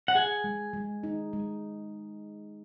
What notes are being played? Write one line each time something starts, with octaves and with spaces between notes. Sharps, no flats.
F#5
G#4 G#5
G#3
G#3
D#4
G#3